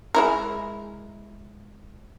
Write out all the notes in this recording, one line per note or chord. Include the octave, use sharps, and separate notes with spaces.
G#3 E4 A#4